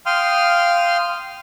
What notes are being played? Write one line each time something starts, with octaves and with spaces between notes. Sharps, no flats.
F5 G5 C6 D#6 F6